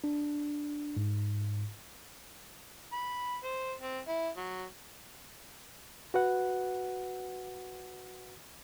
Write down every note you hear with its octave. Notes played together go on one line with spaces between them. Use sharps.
D4
G#2
B5
C5
C4
E4
F#3
F#4 B4 F#5